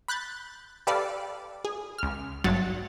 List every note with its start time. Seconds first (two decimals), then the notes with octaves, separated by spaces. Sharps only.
0.08 B5 F#6 G6 A6
0.87 G4 A4 B4 D5 F5
1.65 G#4
1.98 C#2 F6
2.44 G#1 G2 F#3 F#4 A6